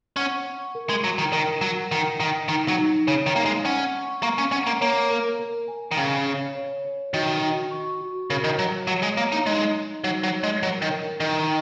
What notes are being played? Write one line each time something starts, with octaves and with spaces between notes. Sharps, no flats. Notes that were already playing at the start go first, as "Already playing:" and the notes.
C#4 F#5
C#6
A#4
G#3
F#3 A#4
D#3
D#3 A#4
F#3 F#5
D#3 A#4
D#3 A#5
D#3 D#4
F#3
D#4
C#3 C#5
D#3
A#3 D#4
G#3
C#4 F#5
C#6
A#3 C#6
C#4
C#4 F#5
A#3
A#3 C#5
A#4
A#4
G#5
D#3
C#3 G#5
C#5
C#5
C#5
D#3 F#4
F#4
C#6
F#4
C#3 A#4
D#3
F#3 A#5
F#3 C#5
G#3
A#3 C#5
D#4
G#3 D#4
D#4
F#3 D#4
F#3
C#5
G#3
F#3 A#4
D#3
A#4
D#3 A#4